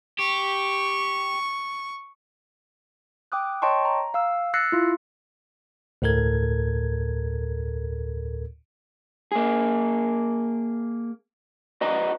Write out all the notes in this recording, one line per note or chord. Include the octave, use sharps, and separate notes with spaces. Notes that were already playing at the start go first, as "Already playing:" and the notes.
G4 C#6
G5 D6 D#6 F#6
C#5 D#5 G5 A5 C6 C#6
A#5
F5 E6
E6 F#6 A6 A#6 C7 C#7
E4 F4
D2 A2 A4 A#4 G#6
A#3 G#4
F#4 B4 D5 D#5 A#5